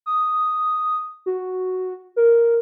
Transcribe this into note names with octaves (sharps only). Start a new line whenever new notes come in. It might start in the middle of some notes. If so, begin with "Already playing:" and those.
D#6
F#4
A#4